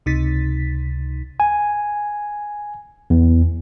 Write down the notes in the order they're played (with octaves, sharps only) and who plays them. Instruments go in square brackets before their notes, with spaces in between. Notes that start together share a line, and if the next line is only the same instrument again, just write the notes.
[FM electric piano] C#2 C3 D#4 A6 B6
[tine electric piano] G#5
E2